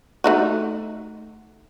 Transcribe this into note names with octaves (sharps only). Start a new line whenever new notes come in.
A3 D#4 F#4